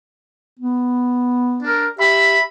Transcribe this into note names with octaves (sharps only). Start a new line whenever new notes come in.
B3
D4 A#4
G4 E5 B5